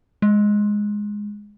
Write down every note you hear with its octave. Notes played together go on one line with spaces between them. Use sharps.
G#3